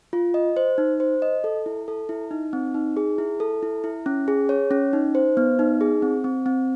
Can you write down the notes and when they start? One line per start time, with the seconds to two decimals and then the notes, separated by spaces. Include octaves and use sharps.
0.13 F4
0.34 D#5
0.57 C5
0.78 D#4
1.00 C5
1.22 D#5
1.44 A4
1.66 E4
1.88 A4
2.09 E4
2.31 D#4
2.53 C4
2.74 D#4
2.97 G#4
3.18 E4
3.40 A4
3.63 E4
3.84 E4
4.06 C#4
4.28 G#4
4.49 C#5
4.71 C#4
4.93 D#4
5.15 C5
5.37 B3
5.59 D#4
5.81 G#4
6.02 C4
6.24 C4
6.46 C4